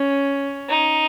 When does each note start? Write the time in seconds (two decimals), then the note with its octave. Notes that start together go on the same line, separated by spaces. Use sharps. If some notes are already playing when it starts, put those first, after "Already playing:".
Already playing: C#4
0.70 D#4